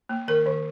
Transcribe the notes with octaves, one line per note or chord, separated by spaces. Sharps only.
A#3
D#3 A#4
D#3